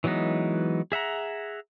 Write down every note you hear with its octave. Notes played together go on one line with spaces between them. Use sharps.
E3 F#3 G#3 B3 D#4
G#4 E5 F#5 A#5